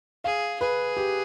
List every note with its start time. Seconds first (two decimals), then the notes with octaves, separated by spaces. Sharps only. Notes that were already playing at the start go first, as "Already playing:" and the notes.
0.24 G#4 F5
0.61 G#4 B4
0.97 G4